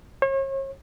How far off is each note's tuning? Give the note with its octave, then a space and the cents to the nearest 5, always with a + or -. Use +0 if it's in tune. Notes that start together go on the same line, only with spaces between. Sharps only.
C#5 -40